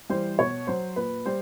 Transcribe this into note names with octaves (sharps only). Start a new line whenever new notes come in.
E3 G3 C5
B2 C#5
F#3 C5
A#2 B4
G3 C5